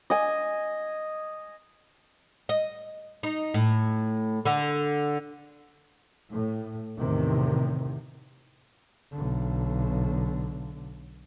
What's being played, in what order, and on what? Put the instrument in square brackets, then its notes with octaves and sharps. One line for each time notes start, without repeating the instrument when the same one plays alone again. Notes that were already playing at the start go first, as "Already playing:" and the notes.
[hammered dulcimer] D#5 G#5
[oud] D#5
D#4
A2
D3
[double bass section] A2
E2 A2 C3 D#3
[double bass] B1 D3